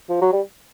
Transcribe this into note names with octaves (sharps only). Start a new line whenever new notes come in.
F3
F#3
G3